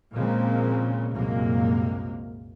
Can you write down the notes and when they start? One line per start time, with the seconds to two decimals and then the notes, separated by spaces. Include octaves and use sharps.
0.13 A#2 C#3 F3 G#3 A#3 C4
1.12 C2 F#2 A#2 G#3 A#3